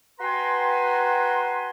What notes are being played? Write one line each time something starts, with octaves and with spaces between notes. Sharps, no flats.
F#4 B4 G5 G#5 A#5 C6